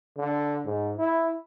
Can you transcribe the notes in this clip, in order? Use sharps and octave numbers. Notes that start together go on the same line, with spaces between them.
D3
G#2
E4